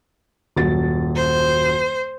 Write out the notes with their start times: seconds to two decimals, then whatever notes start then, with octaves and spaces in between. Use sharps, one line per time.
0.56 D#1 F#2 A6
1.16 C5